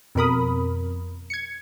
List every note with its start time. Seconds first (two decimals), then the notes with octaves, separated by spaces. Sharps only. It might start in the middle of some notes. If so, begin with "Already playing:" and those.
0.15 F2 B2 A#4 B5 D#6
1.30 G#6 C#7